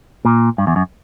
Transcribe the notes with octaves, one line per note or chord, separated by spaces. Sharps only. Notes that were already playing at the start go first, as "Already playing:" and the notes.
A#2
G2
E2
F#2